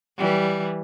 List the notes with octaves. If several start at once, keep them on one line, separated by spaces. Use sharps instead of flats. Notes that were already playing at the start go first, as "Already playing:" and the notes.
E3 G3